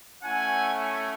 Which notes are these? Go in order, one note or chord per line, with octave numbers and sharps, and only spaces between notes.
A3 C#4 E4 F#5 G#5